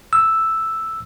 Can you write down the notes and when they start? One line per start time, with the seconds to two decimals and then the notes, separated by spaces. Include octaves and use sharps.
0.13 E6